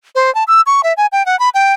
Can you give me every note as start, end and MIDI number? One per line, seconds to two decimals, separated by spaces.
0.15 0.33 72
0.35 0.44 81
0.47 0.61 88
0.66 0.81 85
0.83 0.93 76
0.97 1.06 80
1.12 1.25 79
1.26 1.38 78
1.39 1.49 83
1.54 1.74 79